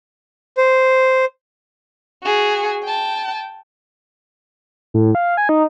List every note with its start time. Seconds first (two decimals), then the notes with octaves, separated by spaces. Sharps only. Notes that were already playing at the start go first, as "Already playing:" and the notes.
0.57 C5
2.24 F#4 G#4
2.83 G5 A5
4.94 A2
5.15 F5
5.37 G#5
5.49 D#4